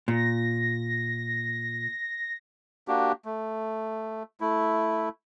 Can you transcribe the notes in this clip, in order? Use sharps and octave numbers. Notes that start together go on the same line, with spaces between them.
A#2 A#6
A#3 D4 F#4 G4
A3
A3 E4